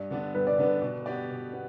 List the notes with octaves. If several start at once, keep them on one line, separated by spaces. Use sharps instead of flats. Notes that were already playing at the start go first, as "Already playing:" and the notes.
Already playing: G2 D5
D3 B3 D4
G2 B4
D5
D3 B3 D4 B4
B2
B3 G4 D5
B2
B3